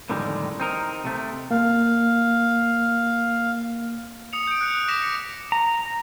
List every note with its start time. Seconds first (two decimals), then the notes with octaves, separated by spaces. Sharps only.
0.10 F2 A2 D3 D#3 G3 G#3
0.60 C4 D#4 A#4
1.05 C3 A3
1.51 A#3 F5
4.33 D#6 C#7 F7
4.47 G6 D7
4.61 F#6 C#7
4.74 D#6
4.88 D6 A#6 B6 E7 F7
5.03 C#7
5.52 A#5